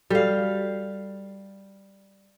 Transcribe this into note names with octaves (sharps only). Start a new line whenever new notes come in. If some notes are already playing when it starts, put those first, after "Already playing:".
G3 F#4 A4 D5 F5